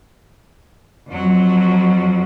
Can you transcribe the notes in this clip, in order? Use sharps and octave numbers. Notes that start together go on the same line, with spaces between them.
F2 F#3